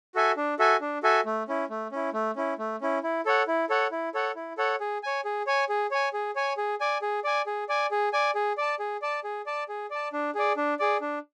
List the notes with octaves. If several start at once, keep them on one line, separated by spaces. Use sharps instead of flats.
F#4 A4 E5 G#5
D4
F#4 A4 E5 G#5
D4
F#4 A4 E5 G#5
A3
C#4 E4
A3
C#4 E4
A3
C#4 E4
A3
C#4 E4
E4
A4 C#5 F#5
E4
A4 C#5 F#5
E4
A4 C#5 F#5
E4
A4 C#5 F#5
G#4
C#5 G#5
G#4
C#5 G#5
G#4
C#5 G#5
G#4
C#5 G#5
G#4
D5 G#5
G#4
D5 G#5
G#4
D5 G#5
G#4
D5 G#5
G#4
D5 A5
G#4
D5 A5
G#4
D5 A5
G#4
D5 A5
D4
G#4 D5
D4
G#4 D5
D4